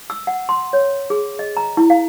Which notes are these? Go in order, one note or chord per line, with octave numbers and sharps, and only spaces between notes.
E6
F#5
C6
C#5
G#4
D#5
A#5
E4
F5